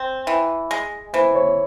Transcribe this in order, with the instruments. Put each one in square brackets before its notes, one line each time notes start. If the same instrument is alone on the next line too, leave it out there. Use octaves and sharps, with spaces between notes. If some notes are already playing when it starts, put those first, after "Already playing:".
Already playing: [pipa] C4
E3
G#3
[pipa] E3 [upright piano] C5
[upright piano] C#5